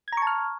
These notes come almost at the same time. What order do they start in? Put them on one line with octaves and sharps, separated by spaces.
G#6 A#5 C#6 A5 F6